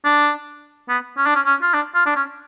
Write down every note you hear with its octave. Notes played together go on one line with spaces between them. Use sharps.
D4
B3
C#4
D4
C#4
C#4
F4
D4
F4
D4
C#4